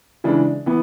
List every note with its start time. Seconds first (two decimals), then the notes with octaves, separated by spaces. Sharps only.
0.24 C#3 E3 G#3 D4
0.66 E3 B3